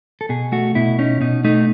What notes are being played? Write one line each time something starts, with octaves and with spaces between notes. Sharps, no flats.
A4
B2 G#4
A3 F#4
B2 E4
C#4 D#4
B2 D#4
A3 D#4